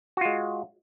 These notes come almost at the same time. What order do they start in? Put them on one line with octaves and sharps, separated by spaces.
F#4 F4 G#3